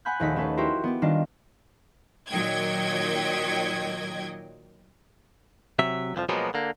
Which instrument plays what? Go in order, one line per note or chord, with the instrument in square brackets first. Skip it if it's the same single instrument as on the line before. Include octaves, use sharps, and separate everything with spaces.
[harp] F#5 G#5 B5 F#6 G6
A#1 D#2 A3 D#4 B5 B6
A3 C#4 G#4 A4 B4
E4 F#4 G4 A#4 C5
B3 G4
D#3 G3 D4 F4 A#4
[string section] A#2 D#3 F#3 D#5 G5 G#6
[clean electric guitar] C3 F#3 E5
C2 F2 E3 F3
B2 F3 F#3 G#3 A#3 B3
D3 A#3